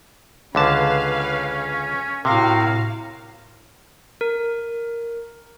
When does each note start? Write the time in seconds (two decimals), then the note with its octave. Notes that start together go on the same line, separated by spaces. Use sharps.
0.55 C#2 D3 C#4 B4 F5 A5
2.25 A2 C3 F#4 A#4 F5
4.21 A#4